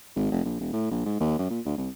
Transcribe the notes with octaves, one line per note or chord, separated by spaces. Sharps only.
G#1
F1
A#1
E1
A2
A#1
G#2
D#2
F#2
A#2
D2
C2